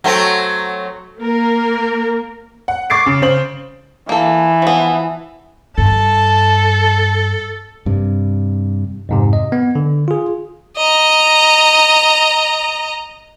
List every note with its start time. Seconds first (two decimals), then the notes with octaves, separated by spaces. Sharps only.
0.04 F#3 A3 C4
1.20 A#3 A#4
2.68 F#5
2.90 C#6 D6 A6 C7 D7
3.06 C#3
3.22 C#3 C5 F#7
4.09 E3 A#3 A4
4.62 F3 B3
5.78 G2 A4 A5
7.86 G2 C3
9.09 F2 G#2 C3
9.33 D#5
9.52 B3
9.75 D3
10.08 F4 G#4
10.77 D#5 A#5